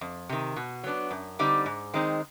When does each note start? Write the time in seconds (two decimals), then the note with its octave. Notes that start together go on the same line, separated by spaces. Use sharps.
0.01 F2
0.29 C3 D#3
0.56 B2
0.84 F#3 B3 D4
1.11 F#2
1.39 D3 G3 C4 D#4
1.66 G#2
1.94 D#3 G#3 C4 D#4